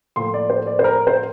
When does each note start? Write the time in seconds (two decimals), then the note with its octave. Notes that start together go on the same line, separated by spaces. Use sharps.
0.16 A2 F3 A#3 C6
0.34 D5
0.50 C5
0.67 D5
0.79 C5
0.84 A#4
1.07 C5